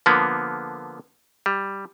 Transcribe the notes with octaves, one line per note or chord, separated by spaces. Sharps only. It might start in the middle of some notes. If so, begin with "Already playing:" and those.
D3 F3 A#3 B3
G3